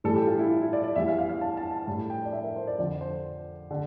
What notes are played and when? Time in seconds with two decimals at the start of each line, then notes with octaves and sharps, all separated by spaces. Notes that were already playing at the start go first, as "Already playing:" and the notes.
0.04 A2 E3 G3 A4
0.16 G4
0.27 F4
0.39 E4
0.50 F4
0.62 E4
0.73 D5
0.84 D5
0.96 E2 E3 G3 E5
1.08 F5
1.19 F5
1.29 F5
1.41 A5
1.57 A5
1.71 A5
1.87 A2 G3 A5
2.10 G5
2.25 D5
2.33 E5
2.44 A#4
2.56 C5
2.67 D5
2.79 F2 D3 F3 D5
3.01 C5
3.71 D3